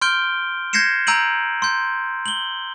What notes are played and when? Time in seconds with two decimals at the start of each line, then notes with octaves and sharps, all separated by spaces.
0.02 C6 F6 G6 D7 G7
0.73 G6 G#6 A#6 C7 C#7 E7
1.07 A#5 E6 G6 D7 D#7 F#7
1.62 C6 G6
2.26 F#7 G7